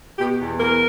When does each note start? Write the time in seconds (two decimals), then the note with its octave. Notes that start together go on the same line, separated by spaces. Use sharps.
0.19 B2 G4
0.39 E2
0.59 B3 A#4